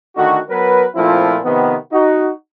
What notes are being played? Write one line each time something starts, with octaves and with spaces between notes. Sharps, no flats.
D3 D#3 A3 F#4
F#3 B3 A#4 B4
A#2 F3 A3 C4 E4 F4
C3 D#3 F3 B3
D#4 F#4